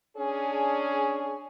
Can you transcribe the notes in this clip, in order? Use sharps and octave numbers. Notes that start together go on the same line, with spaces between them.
C#4 D4 G#4